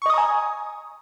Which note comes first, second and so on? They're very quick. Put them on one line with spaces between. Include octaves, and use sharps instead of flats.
C#6 D#5 D#6 A#5 G#5